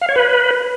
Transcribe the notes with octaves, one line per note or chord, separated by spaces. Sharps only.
F5
C#5
B4